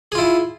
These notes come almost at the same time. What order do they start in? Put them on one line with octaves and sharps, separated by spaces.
G#4 F4 E4